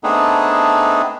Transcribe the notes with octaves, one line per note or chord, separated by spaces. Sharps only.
A3 B3 C4 D4 D#4 G#4